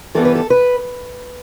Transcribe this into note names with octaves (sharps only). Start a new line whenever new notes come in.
G2 E3 G3 B3 A4
B4
A4
B4